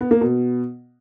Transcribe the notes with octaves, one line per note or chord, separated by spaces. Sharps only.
B3
A#3
B2